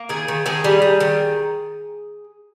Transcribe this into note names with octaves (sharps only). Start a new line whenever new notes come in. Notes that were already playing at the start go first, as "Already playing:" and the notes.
Already playing: A#3
D#3 G#4
D#3
D#3 G#4
G3
G3
D#3